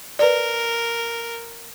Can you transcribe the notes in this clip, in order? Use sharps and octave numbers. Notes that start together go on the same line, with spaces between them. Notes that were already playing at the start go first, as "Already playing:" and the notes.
A#4 B4 D5